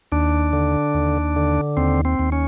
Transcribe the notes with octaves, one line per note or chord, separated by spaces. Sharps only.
D#2 D4
D3
D#2
D3
D#2 C4
C4
D#2
C#4